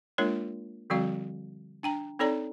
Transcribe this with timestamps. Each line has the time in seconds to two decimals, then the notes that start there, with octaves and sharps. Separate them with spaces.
0.18 G#3 A#3 D4 F4 A#4 C#5
0.90 D3 F3 G3 C4 F#4 F5
1.83 D4 G5 A#5
2.19 C4 D#4 A4 C#5 D5 A#5